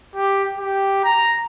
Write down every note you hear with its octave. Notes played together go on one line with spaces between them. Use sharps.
G4
G4
A#5